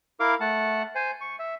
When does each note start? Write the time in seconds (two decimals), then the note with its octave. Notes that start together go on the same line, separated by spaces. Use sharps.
0.20 E4 A#4 F5 D6
0.40 A3 F#5 A5
0.95 C5 G#5
1.21 C#6
1.39 E5